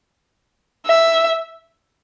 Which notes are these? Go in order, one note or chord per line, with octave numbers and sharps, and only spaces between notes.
E5